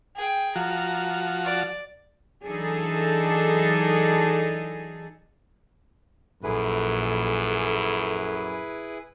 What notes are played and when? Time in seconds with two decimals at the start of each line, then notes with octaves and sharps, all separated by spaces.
0.16 G#4 G5
0.56 F3 F#4 A#5
1.45 D5
2.45 E3 F#3 D4 D#4 G#4 A4
6.43 A#1 F#2 E4 G#4 A4 B4